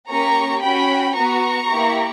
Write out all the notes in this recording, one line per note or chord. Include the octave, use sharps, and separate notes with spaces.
A#3 C#4 G4 A#5 C#6
C#4 F#4 G5 B5
B3 F#4 A#5 C#6
A#3 E4 G4